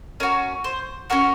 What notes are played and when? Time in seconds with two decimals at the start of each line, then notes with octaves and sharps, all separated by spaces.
0.20 C#4 F#4 A#4
0.64 C5
1.10 C#4 F#4 A#4